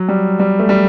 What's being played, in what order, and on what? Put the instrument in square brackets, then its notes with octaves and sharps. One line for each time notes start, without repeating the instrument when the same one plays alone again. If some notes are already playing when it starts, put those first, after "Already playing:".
Already playing: [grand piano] F#3
G3
G3
A3
G3